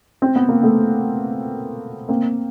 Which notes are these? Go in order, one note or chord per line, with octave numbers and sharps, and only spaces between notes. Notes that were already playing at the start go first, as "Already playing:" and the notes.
C4
B3
A#3
A3 B3
A#3 C4